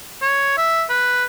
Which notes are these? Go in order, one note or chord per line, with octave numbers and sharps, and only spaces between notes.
C#5
E5
B4